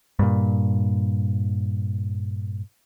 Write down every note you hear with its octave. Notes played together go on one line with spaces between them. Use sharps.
G2 A#2